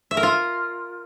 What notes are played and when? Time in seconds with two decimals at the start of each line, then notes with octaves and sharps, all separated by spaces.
0.11 E5
0.17 A#4
0.23 F4